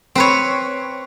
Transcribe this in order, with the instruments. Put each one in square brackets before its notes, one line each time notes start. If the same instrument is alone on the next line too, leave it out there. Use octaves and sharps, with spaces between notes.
[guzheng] C4 B4 C#5